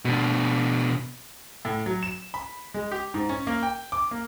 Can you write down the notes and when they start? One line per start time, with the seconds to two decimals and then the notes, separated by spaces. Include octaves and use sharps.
0.05 B2 D4
1.65 A2
1.86 F#3
2.03 E7
2.34 B5
2.74 G#3
2.91 G4
3.14 G#2
3.29 C#4
3.47 A#3
3.63 G5
3.92 D6
4.11 A#3